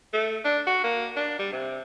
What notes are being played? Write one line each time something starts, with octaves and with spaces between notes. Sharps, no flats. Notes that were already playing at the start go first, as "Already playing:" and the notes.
A3
D4
F#4
A#3
D4
G3
C3